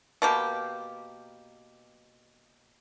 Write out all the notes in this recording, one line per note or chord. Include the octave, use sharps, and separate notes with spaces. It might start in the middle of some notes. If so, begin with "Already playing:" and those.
B2 A#3 G4